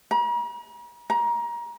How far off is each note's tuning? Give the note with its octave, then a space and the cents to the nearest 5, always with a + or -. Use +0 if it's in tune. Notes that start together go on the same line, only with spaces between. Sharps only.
A#5 +45
A#5 +25